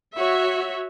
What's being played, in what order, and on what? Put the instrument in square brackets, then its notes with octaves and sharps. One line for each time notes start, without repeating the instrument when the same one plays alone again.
[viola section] F#4 C#5 E5